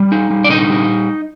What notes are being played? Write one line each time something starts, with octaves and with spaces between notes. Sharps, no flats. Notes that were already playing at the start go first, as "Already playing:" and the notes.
Already playing: G3
D#4
G3
D5
D3 D#4 D#5
G3